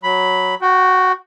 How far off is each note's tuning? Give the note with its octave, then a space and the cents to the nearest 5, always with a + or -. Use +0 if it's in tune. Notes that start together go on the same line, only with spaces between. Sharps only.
F#3 +0 B5 +0
F#4 +0 G5 -30